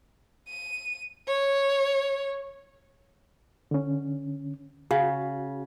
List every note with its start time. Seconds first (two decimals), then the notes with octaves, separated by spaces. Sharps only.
0.48 D#7
1.28 C#5
3.71 D3 C#4
4.91 C#3 F#4